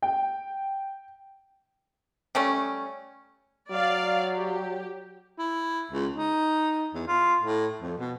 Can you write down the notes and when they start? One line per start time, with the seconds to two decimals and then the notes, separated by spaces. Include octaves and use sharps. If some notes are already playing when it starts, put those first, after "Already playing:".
0.02 G5
2.35 G3 A3 C#4
3.70 F#3 D5 F5
4.35 G4
5.38 E4
5.92 C#2
6.16 D#4
6.94 E2
7.08 F4
7.40 A2
7.81 F2
7.98 B2